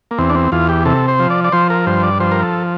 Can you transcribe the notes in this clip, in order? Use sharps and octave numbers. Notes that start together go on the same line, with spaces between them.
A#3
E2 C4
D4
C4
E2 F4
G4
C3 A4
C5
F3
D5
D5
F3 C5
A#4
G2 C5
D5
F3 C5
A#4
A4